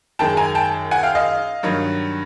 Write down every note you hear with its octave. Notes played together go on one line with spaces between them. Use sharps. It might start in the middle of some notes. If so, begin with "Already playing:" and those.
F#2 D#3 G#3 G5 A5
G#5 A#5
G5 A5
F#5 G#5
F5 G5
D#5 F5
G2 D#3 F#3